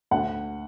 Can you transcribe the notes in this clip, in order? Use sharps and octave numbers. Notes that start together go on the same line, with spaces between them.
D2 F#5